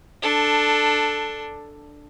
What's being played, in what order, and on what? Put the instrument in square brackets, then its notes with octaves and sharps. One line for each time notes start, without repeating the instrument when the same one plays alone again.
[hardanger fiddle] D4 A4